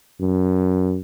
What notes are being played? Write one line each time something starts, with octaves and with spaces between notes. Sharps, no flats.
F#2